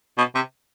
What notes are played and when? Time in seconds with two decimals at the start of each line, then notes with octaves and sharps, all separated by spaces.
0.18 B2
0.35 C3